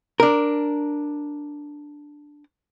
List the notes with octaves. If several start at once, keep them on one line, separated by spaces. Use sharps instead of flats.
D4 A#4